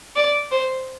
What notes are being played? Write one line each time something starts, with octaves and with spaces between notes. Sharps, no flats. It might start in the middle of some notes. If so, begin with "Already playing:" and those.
D5
C5